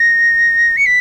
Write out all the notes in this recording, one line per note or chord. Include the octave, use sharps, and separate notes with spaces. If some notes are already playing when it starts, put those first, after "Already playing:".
Already playing: A#6
C#7
B6